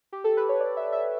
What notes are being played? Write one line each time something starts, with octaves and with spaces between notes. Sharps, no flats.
G4
A4
B4
C#5
D5
E5
E5